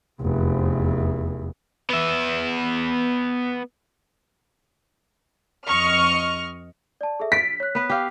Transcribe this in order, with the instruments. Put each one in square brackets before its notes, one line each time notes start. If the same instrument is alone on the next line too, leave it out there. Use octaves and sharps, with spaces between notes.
[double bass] F1 E2
[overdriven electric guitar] B3 E5
[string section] F2 D#5 C#6 F6
[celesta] D5 A5
G#4 A4 E5
[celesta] A6 D7 [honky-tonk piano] B6
[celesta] C#5 F#6
[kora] B3 B4
G4 F5